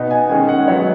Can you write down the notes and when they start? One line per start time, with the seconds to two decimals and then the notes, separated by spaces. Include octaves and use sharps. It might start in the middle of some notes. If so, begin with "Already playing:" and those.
Already playing: B2 B3 D#4
0.11 G#5
0.29 D#3 G#3 C#4 G#5
0.49 F#5
0.68 F#3 B3 D#4 C#5